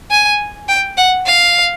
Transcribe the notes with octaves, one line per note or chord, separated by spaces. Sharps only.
G#5
G5
F#5
F5